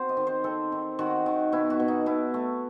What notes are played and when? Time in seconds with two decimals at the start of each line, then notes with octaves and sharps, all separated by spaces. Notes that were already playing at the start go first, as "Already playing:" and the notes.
Already playing: C4 F#4 C5
0.09 D#5
0.17 D#3
0.27 C5
0.44 C4 A4
0.72 D#3
0.99 D#3 F#4
1.26 D#3
1.52 B2 E4
1.70 F#4
1.80 B2
1.88 D#4
2.06 B2 E4
2.34 A3